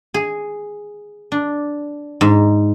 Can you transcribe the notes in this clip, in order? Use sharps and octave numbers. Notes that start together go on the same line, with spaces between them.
G#4
D4
G#2